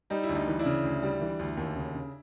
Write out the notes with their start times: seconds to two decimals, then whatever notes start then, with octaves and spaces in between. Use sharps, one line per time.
0.10 G3 D#4
0.23 E4
0.29 D2
0.35 D#4
0.47 E3
0.59 D4 E4
0.65 C#3
0.83 D2
1.02 G3
1.21 E3
1.39 D2
1.57 D#2
1.76 C#3
1.95 C#3